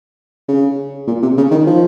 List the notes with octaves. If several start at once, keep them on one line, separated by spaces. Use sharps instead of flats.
C#3
A#2
C3
C#3
D#3
F3